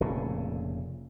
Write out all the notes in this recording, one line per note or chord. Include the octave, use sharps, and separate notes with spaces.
F1 A#2 C#3